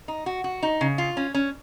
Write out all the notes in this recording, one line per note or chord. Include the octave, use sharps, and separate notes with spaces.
D#4
F#4
F#4
D#4
C#3
F4
C#4
C#4